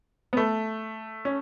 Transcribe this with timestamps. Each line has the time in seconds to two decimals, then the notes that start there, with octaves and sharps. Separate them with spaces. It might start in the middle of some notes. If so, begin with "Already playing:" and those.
0.33 B3
0.37 A3
1.25 C#4